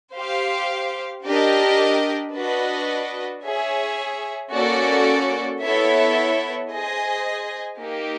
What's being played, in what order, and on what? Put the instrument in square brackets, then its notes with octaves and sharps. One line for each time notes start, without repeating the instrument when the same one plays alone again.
[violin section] G4 C5 F5
D4 G4 A#4 D#5
D4 F#4 B4 D#5
G#4 C#5 E5
A#3 C#4 F#4 A4 D5
B3 E4 A4 C#5 E5
G#4 C5 D#5 G#5
A#3 D#4 G4